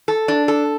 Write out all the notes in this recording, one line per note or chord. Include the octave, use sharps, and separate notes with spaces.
A4
D4
A4